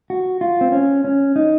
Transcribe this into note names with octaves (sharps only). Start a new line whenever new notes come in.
F#4
F4
C4
C#4
C#4
D#4